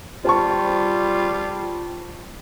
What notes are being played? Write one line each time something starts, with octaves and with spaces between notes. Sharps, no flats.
G3 F4 C5 A5 C#6